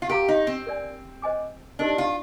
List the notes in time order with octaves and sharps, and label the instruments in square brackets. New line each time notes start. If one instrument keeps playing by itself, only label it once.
[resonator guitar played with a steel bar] F4
[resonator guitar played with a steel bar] G4 [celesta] A#4 F5 A#5 D6
[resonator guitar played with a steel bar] D#4
C4
[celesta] A#4 D5 G#5
C5 D#5 G#5 D6
[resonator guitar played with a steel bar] D4 [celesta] D#4 G4 A#4 D#5
[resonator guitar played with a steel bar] F4